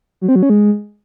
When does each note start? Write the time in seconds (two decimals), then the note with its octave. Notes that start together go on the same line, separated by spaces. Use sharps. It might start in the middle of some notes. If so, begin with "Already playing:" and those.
0.21 F#3
0.28 C4
0.36 F#3
0.43 C#4
0.50 G#3